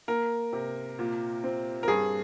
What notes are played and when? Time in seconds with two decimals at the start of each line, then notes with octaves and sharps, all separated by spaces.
0.08 A#3 A#4
0.53 C3
0.99 A#2
1.44 C4
1.83 A#4
1.88 G2 G#4